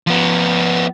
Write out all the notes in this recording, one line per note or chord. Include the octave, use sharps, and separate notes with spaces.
F3 B3